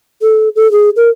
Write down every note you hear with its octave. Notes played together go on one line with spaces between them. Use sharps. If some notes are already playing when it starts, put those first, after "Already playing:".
A4
A4
G#4
A#4